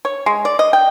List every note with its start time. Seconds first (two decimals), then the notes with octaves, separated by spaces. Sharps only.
0.05 C#5
0.26 G#3
0.45 D5
0.59 D#5
0.73 G5